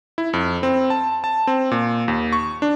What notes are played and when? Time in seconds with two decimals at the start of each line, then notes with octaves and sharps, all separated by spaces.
0.18 E4
0.33 F2
0.63 C4
0.90 A5
1.24 A5
1.47 C4
1.71 A#2
2.08 D#2
2.33 C#6
2.62 D4